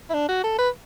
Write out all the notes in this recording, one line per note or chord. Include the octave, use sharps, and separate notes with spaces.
E4
D4
F#4
A4
B4